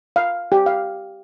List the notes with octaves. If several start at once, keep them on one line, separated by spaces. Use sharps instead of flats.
F5
G4
F5